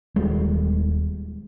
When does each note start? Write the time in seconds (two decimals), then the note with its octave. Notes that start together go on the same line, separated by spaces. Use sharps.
0.16 D#1 G3 G#3